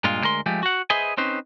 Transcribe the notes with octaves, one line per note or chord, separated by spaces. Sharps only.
G2 A#2 G#3 F4
D2 G#3 A#4 C6
F3 G#3 A3 G4
F#4 F#5
G#4 B4 C5 D#5 E5 G#5
C4 C#4 D#4 B4 C5